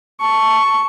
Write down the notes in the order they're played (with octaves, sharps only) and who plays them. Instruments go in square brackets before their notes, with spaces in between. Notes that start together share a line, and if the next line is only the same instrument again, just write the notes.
[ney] A5 [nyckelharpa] C#6